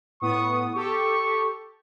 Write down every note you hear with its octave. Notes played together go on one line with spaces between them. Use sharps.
A2 B3 C#6 D#6
G4 A4 C#6